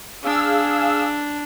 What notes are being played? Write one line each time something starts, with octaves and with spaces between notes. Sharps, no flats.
D4 G#4 F5 E6